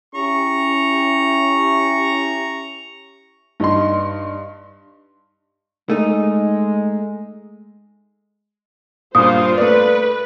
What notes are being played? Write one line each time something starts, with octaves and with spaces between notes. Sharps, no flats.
C#4 E4 G4 A#5 C#6
G2 D#4 C6
G#3 A3 D#4
G2 A#2 F4 C5 D#6
A3 B4 D5